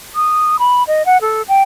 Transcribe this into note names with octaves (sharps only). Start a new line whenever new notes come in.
D#6
B5
D#5
F#5
A4
G5